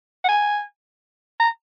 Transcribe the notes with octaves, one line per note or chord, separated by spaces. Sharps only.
F#5
G#5
A#5